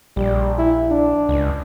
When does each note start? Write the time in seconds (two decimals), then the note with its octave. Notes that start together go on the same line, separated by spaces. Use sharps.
0.17 A#1 G3
0.58 E4
0.91 D4
1.29 C#2